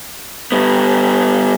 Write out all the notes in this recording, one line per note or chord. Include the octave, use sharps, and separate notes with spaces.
G3 B3